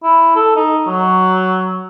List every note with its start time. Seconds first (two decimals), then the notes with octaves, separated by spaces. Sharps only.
0.03 E4
0.36 A4
0.56 D#4
0.87 F#3